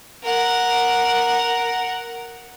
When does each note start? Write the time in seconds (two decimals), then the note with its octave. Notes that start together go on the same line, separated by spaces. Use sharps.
0.23 A#4 F#5